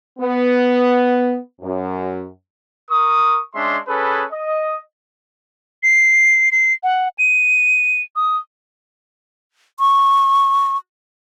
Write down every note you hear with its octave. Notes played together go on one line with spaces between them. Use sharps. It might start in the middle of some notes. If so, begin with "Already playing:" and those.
B3
F#2
A#4 C#6 D#6
G#3 C#4 D4 E5 C6
C#4 G#4 A4 B4
D#5
C7
C7
F#5
D#7
D#6
C#6